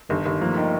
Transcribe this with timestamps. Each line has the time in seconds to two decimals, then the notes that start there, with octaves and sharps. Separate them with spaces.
0.09 G1 D#3 G3
0.25 G1 D#3 G3
0.41 F3 A3 A#3
0.57 D#3